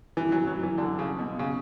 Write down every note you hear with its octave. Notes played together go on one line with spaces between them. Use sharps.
E3
F#3
F#3
E3
D3
C#3
B2
C#3